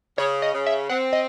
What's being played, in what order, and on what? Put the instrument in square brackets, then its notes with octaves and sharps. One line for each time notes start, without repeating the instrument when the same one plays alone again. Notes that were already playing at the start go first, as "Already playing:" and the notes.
[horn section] C#3 [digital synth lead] C#5
[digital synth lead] D#5
[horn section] C#3
[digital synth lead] E5
[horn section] C4 [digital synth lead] F#5
[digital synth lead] D#5